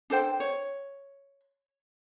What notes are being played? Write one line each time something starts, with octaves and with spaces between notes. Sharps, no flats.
D4 A4 C5 G5
C#5